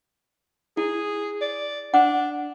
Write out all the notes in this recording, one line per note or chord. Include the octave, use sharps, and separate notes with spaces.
E4 G#4
D5
D4 F#5